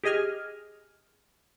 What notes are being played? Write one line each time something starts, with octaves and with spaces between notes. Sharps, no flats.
G4 G#4 D#5 G#5 F6